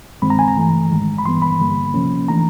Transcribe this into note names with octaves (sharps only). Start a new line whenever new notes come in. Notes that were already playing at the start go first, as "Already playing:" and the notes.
G2 D#3 G#3 C4 B5
A#5
G#5
A#5
G2 E3 A3
G#2 D#3 G#3
B5
G2 E3 G3 B3 C6
B5
G2 D3 G3 A#3
C3 F3 A#3 C#4
E3 A3 D4 A#5